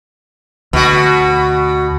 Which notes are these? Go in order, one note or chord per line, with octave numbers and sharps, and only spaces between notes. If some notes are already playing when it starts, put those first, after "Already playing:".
D2 B2 F#4